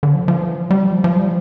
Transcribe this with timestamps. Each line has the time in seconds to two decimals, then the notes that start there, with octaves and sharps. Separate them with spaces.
0.03 D3
0.14 F3
0.28 F3
0.41 E3
0.53 F3
0.71 G3
0.88 F3
1.04 F3
1.16 G3